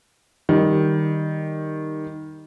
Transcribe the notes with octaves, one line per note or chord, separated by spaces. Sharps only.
D#3 G3